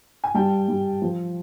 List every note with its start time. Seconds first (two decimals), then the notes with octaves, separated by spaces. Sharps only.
0.24 G#5
0.34 G3 G5 A5
0.68 G3
1.02 F3